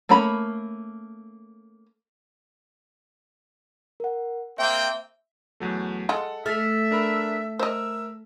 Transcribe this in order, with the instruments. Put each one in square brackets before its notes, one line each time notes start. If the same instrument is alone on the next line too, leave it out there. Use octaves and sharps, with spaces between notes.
[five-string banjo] A3 A#3 C#4 A#5 B5
[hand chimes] A#4 F#5
[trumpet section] A#3 C4 G5 [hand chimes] E5
[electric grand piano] E2 F#3 A3
[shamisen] G#3 F4 [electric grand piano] A4 F#5
[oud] A3 [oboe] E5 [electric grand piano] F6 A6 B6
[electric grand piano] D4 A#4 B5
[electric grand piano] A#4 E5 [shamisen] C5 D#5 [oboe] E6